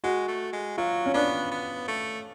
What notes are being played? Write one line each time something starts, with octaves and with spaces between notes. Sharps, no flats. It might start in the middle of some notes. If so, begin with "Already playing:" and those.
G#3 F#4
A3
G#3
F#3 F4
C#4
B3 D4
B3
A3